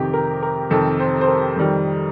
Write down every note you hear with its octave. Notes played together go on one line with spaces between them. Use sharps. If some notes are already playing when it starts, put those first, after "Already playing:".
Already playing: F2 C3 D#3 G4
A#4
A#4
F2 C3 D#3 A4
C5
C5
A#4
F2 D#3 G3